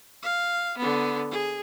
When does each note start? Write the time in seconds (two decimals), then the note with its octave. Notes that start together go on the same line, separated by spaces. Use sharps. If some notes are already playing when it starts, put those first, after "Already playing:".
0.23 F5
0.78 D3 B3
1.31 G#4